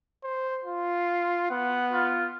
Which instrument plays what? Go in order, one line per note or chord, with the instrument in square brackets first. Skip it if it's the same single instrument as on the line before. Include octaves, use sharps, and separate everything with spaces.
[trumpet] C5
F4
[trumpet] B3 [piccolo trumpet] F#5
[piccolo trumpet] F4